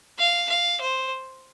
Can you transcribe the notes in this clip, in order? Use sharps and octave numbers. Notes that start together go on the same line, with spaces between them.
F5
F5
C5